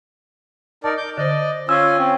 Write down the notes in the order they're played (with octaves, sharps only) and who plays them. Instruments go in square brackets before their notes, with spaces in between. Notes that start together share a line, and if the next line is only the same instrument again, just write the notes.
[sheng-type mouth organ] D#4 A#4 D5 [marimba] A5
[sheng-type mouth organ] D6 G6
[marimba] D3 C5 [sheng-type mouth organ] D5 D#5
[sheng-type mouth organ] C#4 F4 G#5 [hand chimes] E6
[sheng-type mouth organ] C4 C#4